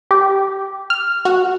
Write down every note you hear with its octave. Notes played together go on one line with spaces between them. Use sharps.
G4
F6
F#4